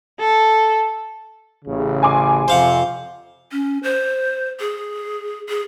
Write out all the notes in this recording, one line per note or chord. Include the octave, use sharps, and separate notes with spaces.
A4
A1 C#3
G#5 C6 D6
F2 C3 C5 F5 F#5
C#4
C5
G#4
G#4